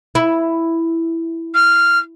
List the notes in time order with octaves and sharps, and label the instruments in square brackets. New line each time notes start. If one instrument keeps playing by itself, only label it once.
[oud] E4
[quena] F6